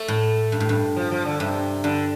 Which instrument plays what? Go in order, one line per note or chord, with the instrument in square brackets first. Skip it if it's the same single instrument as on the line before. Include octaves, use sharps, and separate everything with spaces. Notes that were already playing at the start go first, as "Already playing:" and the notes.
Already playing: [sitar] A3
[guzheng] A2
G2
A2
G2
[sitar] F3
F3
D3
[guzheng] G2 [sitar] C3
[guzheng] G2 [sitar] D3